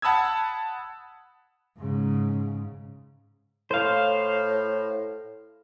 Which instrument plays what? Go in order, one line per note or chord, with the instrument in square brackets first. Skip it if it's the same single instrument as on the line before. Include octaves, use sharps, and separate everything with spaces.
[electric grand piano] F#5 A5 B5 D#6 E6 G#6
[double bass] G#2 C#3
[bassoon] A2 [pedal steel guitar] C5 F5